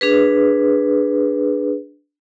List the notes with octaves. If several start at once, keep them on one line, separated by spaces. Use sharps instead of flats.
D4 G#4 B4